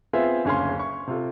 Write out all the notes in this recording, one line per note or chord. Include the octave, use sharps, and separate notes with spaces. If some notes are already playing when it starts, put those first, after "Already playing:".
B3 C4 F4 G#4 E5
F#1 D2 C#4 G#4 F5 C6
C#6
C3 F4 A4